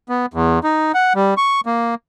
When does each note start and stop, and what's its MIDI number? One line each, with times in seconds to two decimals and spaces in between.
0.09 0.26 59
0.34 0.59 40
0.64 0.92 63
0.94 1.13 78
1.15 1.34 55
1.37 1.61 85
1.66 1.95 58